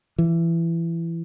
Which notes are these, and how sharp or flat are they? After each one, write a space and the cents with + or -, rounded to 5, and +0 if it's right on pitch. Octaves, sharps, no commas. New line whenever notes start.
E3 +20